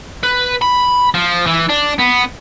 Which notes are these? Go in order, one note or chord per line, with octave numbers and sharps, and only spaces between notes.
B4
B5
F3
E3
D4
B3